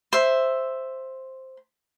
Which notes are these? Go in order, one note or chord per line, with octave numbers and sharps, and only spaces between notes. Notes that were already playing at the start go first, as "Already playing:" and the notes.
C5 E5